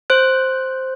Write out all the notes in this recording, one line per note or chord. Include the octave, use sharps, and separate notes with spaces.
C5 F#6